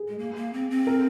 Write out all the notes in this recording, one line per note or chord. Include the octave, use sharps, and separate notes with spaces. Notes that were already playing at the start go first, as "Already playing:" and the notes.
Already playing: G#4
G#3
A#3
A#3
C4
C4
A#4